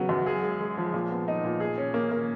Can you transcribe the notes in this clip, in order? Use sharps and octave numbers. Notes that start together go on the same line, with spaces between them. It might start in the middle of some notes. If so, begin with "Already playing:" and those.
Already playing: C#3 F#3 B3
F#2
G#4
G#3
G#3
F3
A#2
B3
D#4
A#2
G#4
C#4
A#3
A#3